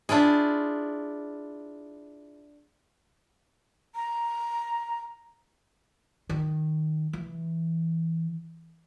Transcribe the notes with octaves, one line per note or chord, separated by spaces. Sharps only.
D4 E4 F4 G#4
A#5
D#3
E3